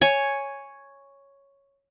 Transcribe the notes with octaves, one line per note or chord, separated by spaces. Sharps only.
C#5 G#5 C#6